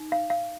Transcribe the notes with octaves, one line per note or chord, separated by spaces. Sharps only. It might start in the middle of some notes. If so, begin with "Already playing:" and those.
Already playing: D#4
F5
F5